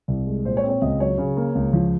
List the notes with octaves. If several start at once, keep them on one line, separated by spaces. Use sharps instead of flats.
C2
G#3
A#2 C5
C#5
C4
C#5
C#2 D#5
F#3 C#5
C#3
A#3
C#2
F3